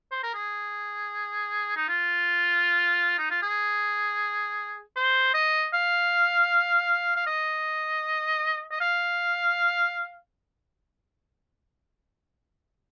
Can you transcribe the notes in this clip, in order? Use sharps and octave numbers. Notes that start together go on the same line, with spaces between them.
C5
A#4
G#4
D#4
F4
D#4
F4
G#4
C5
D#5
F5
F5
D#5
D#5
F5